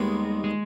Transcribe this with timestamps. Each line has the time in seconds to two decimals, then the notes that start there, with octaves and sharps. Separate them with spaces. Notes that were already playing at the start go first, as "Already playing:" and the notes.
Already playing: D#2 D#3 G3 G#3 B3
0.44 G#3